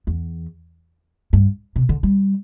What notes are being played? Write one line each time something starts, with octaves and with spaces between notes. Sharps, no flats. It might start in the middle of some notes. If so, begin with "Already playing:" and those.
E2
G2
C3
D3
G3